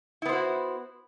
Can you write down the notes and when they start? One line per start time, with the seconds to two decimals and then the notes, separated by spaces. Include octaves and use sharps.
0.22 E4
0.26 B3
0.29 C5
0.33 F#4